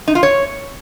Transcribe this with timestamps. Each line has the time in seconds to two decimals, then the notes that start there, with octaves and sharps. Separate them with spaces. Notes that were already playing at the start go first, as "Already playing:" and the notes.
0.08 D#4
0.15 F4
0.23 C#5